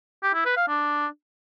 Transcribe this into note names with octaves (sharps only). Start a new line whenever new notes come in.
G4
E4
B4
F5
D4